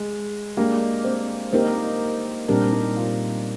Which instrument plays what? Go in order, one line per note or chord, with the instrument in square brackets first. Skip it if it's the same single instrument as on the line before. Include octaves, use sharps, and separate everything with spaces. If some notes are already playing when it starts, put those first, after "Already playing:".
Already playing: [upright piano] G#3
[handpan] G#3 D4 G4 [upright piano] A#3
[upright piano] C4
[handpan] A#3 D#4 G4 A#4 [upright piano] C4
[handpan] A#2 G3 C4 G4 A#4 [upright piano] D4
[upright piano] D#4
F4